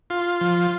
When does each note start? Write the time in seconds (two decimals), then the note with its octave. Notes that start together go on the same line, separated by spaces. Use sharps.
0.10 F4
0.41 F3